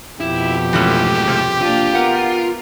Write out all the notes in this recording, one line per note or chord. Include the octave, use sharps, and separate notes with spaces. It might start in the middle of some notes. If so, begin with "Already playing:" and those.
F2 B2 E4 G4
G#2 E3 F3 A3 C#4
C3 F3
A#3 D4 F4
B3 A#4 F#5